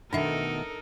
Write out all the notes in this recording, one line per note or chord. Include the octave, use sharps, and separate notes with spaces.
B2 D#3 A3 D4 D#4 A4 A#4 E5